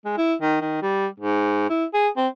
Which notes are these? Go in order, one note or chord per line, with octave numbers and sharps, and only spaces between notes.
G#3
E4
D#3
D#3
G3
G#2
E4
G#4
C4